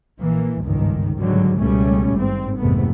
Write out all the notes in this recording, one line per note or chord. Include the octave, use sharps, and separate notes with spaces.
A#1 E3 A#3
G1 C#2 G#2 D#3
G#2 D3 F#3 G3
C#2 B2 G3 A3 C#4
G#1 G2 C4
G#1 F2 C3 A3 B3